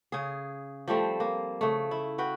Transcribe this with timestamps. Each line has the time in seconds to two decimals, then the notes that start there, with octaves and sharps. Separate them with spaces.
0.12 C#3 G#4
0.88 F3 G3 A3 C4
1.20 A#3
1.61 C#3 A3
1.91 E4
2.18 F#4 B4 G5